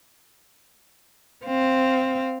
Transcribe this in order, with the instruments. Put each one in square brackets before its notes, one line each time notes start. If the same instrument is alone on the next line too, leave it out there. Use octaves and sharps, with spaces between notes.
[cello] C4 F5